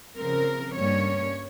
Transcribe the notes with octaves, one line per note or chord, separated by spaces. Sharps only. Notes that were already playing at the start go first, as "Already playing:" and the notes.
C#3 F3 C4 A#4
G2 G3 A#3 C#4 C#5